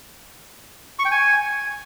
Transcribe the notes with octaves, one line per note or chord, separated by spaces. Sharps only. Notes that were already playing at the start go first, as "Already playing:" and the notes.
C#6
G5
G#5